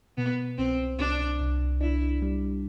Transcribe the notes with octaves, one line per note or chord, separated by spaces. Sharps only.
B2 B3
C2 C4
C2 D4
C2
D4 E4
G3